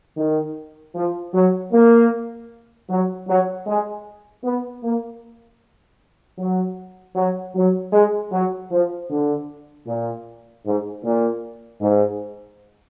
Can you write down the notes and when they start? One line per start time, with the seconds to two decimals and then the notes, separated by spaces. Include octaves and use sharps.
0.17 D#3
0.95 F3
1.34 F#3
1.72 A#3
2.90 F#3
3.28 F#3
3.67 G#3
4.44 B3
4.83 A#3
6.38 F#3
7.15 F#3
7.55 F#3
7.93 G#3
8.32 F#3
8.71 F3
9.10 D3
9.87 A#2
10.65 G#2
11.04 A#2
11.81 G#2